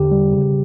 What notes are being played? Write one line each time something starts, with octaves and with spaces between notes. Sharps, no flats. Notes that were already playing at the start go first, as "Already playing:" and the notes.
Already playing: E2 D3 G4
G3
C#3